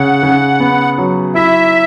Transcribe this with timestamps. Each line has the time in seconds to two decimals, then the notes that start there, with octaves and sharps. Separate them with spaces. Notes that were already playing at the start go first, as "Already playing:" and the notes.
Already playing: C#3 F#5
0.23 C#3
0.60 B3
0.98 F#3
1.35 E4 E5